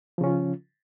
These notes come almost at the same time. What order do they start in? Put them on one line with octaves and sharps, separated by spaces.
F3 C#3 C#4 F4